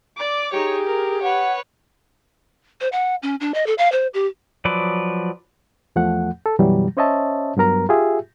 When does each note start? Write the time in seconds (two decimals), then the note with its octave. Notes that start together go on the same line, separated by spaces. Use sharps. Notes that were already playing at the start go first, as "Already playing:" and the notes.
0.17 D5 D6
0.53 D#4 G4 G#4 C#5
0.87 A#4
1.22 B4 C#5 F#5
2.81 C5
2.92 F#5
3.23 C#4
3.40 D4
3.54 D#5
3.66 A4
3.78 F5
3.92 C5
4.14 G4
4.65 F3 F#3 B4 D5
5.96 E2 F3 A3 F#5
6.46 A4
6.59 F#2 B2 E3 F#3 G3
6.97 C#4 C5 C#5 D#5 E5 A5
7.57 G2 F#3 B3 A#4 A#5
7.89 F4 G4 G#4 E5